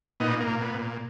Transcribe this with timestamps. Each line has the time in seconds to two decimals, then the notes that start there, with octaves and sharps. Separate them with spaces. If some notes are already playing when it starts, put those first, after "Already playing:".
0.20 A#2 B3 D#4
0.41 A#3
0.47 A#2
0.61 B3
0.74 A#2